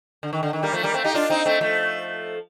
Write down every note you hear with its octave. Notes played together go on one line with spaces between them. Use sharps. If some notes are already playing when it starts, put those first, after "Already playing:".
D3
D#3
D3
D#3
G3 A#3
F3 A3
G3 A#3
A3 C4
D#4 G4
D4 F4
C4 D#4
A3 C4
F3 A3